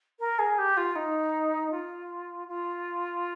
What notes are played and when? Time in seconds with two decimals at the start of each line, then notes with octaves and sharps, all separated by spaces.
0.19 A#4
0.39 G#4
0.58 G4
0.77 F4
0.95 D#4
1.71 F4
2.48 F4